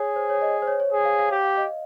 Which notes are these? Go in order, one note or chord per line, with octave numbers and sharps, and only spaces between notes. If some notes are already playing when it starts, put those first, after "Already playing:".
Already playing: G#4 C#5
C5
C#5
D#5
C5
C#5
C#5
G#4
F5
F5
G4 F5
F5
D#5